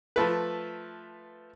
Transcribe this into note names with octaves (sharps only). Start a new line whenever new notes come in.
F3 A3 B4